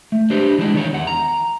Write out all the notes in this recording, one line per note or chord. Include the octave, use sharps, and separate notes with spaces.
A3
D4 G4 B4 C5
E3 G#3 D4 D#4
D#3 E3 C#5
E2 F#5
A#5